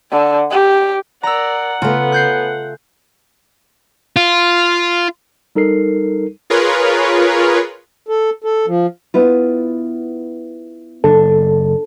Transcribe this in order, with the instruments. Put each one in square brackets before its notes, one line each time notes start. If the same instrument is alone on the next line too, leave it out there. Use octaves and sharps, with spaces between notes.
[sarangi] D3
G4
[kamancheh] A#4 D5 [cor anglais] F#5 [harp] A#5 E6
[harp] C#3 [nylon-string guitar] A3 F4 [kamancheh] B3
[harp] F#6 G6 C7
[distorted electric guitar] F4
[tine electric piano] G3 D#4 A4 A#4 C7
[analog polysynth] F4 G#4 A#4 B4 C#5
[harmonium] A4
A4
F3
[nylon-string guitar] B3 E4 F4
[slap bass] F#1 [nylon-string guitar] D4 [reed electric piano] A4